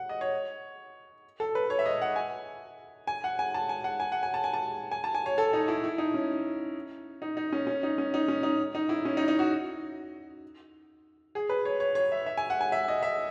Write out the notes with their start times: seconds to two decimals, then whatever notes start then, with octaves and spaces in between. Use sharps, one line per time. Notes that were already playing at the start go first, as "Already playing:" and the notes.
Already playing: F#5
0.09 D#5
0.21 C#5
1.40 A4
1.55 B4
1.70 C#5
1.79 E5
1.86 D#5
2.02 F#5
2.16 G#5
3.07 G#5
3.24 F#5
3.39 G#5
3.54 A5
3.69 G#5
3.84 F#5
4.00 G#5
4.12 F#5
4.23 G#5
4.34 A5
4.44 G#5
4.53 A5
4.91 G#5
5.04 A5
5.15 G#5
5.26 C#5
5.38 A4
5.53 D#4
5.68 E4
5.84 E4
5.98 D#4
6.14 C#4
7.22 D#4
7.37 D#4
7.53 C#4
7.67 C#4
7.83 D#4
7.98 C#4
8.14 D#4
8.28 C#4
8.43 D#4
8.75 D#4
8.89 E4
9.05 C#4
9.17 D#4
9.28 D#4
9.39 F#4
11.35 G#4
11.49 B4
11.65 C#5
11.80 C#5
11.95 C#5
12.12 E5
12.26 E5
12.37 G#5
12.50 F#5
12.61 G#5
12.72 E5
12.88 D#5
13.03 E5